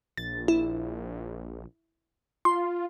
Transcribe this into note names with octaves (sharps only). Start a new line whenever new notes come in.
A#1 A6
E4
F4 C6